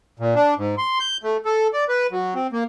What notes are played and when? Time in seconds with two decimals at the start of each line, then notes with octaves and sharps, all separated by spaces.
0.20 A#2
0.35 D4
0.58 G#2
0.78 C6
1.00 G6
1.23 A3
1.45 A4
1.73 D5
1.89 B4
2.11 F#3
2.34 C4
2.53 A#3